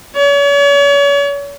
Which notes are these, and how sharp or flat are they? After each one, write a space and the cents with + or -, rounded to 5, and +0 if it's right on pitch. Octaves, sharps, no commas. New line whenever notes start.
C#5 +40